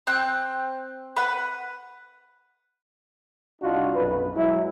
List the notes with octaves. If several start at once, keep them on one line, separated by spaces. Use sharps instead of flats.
C4 G5 F#6
B4 F#5
C2 D4 D#4 F4 F#4
B1 F#2 B4
F#3 G#3 E4